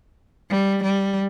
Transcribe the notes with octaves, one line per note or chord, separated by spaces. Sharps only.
G3
G3